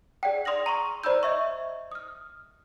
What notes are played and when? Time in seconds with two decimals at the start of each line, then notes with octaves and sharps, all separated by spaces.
0.23 G#4 D5 F#5 G5
0.45 D5 C6 D#6 F6 A#6 F#7
0.66 A#5 C6 C#6 D#6
1.04 C5 D5 A#5 B5 E6 G6
1.23 D#5 E5 C#6
1.92 D#6 F6